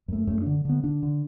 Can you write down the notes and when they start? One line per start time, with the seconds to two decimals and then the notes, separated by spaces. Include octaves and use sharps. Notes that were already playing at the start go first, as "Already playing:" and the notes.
0.08 F#2 A3
0.27 F#2 A3
0.41 D3 D4
0.65 D3 B3
0.84 D3 D4
1.03 D3